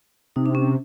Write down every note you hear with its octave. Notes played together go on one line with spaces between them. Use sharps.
C3 D#4
D4
C#4